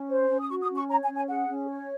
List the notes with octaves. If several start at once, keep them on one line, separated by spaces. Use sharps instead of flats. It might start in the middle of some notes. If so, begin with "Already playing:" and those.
Already playing: C#4
C5
C#4
D#6
F#4 C#6
D#6
C#4
C#6
C#5 A#5
G#5
C#4
G#5
G#4 F#5
C#4
C#5